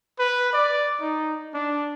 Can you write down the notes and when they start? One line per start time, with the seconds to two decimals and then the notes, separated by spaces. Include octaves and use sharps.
0.19 B4
0.53 D5
1.00 D#4
1.54 D4